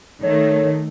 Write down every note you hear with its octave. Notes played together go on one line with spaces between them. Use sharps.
D#3 A3 C#5